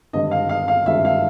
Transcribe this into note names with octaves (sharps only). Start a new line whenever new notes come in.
G#1 G2 D3 D#5
F5
F5
F5
G#1 G2 D3 E5
F5